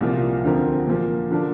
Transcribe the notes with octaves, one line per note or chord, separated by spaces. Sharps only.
C2 A#2 F3 A#3 F4
D2 D3 F3 C4 A#4
A#2 F3 A#3
D3 F3 A#3 D4